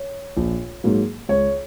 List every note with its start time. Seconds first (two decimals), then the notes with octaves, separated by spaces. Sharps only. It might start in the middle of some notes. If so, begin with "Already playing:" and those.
Already playing: C#5
0.37 A#1
0.84 G#2 F#3 A#3
1.29 C#2 C#5